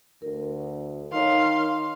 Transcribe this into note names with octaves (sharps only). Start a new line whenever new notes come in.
D2 A#4
D#3 D#4 C#5 F5 C6